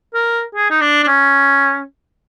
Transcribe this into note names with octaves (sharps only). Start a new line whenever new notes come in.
A#4
G#4
D#4
D4
D4
C#4